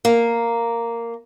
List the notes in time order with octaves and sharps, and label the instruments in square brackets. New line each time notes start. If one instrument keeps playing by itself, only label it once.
[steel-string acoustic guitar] A#3